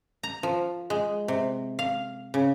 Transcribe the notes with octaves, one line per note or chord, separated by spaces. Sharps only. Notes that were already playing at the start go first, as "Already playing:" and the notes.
A#5
F3
G#3
C3
F5
C#3